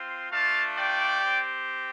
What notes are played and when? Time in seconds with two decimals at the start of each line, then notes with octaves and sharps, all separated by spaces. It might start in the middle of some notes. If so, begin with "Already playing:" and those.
Already playing: C4 F4
0.32 A3 D4 F4 F5 A5
0.76 D5 G5
1.21 C4 G4